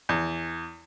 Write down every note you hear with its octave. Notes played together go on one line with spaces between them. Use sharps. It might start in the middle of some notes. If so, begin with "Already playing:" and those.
E2